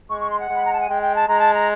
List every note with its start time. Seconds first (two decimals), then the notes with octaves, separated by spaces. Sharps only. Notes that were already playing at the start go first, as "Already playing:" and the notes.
0.10 G#3 C#6
0.20 C#6
0.29 C6
0.40 F#5
0.49 G#3
0.55 B5
0.64 A#5
0.72 A5
0.81 G#5
0.88 G#3 G5
1.02 G5
1.15 A5
1.28 G#3 A#5
1.40 A5
1.54 A#5